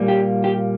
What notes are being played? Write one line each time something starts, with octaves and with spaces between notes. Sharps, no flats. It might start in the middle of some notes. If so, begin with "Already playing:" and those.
Already playing: A#2 G3 A#3
G4
G4